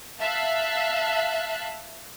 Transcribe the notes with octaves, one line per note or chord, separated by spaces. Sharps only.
E5 F5 A5 F#6